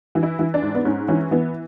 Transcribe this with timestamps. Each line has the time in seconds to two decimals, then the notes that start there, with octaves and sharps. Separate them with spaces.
0.15 E3
0.23 E4
0.39 E3
0.54 D4
0.62 G#2
0.75 B3
0.85 G#2 C#4
1.08 E3 C#4
1.31 E3 B3